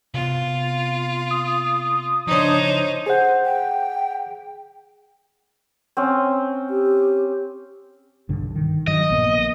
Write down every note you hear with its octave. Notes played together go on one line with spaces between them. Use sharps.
C3 B3 F4
D#6
C#3 F3 D4 D#4 C5 C#5
G#4 C5 F#5
G5
C4 C#4
G4
B1 G2 D3
D#3
G2 D#3 F#3 D#5
A#1 A#3 B3